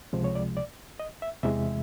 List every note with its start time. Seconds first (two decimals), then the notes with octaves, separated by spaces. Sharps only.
0.13 C#2 C3 F3 G#3 C5
0.24 C#5
0.35 D5
0.57 D5
1.00 D#5
1.22 E5
1.43 E2 C3 E3 G#3 E5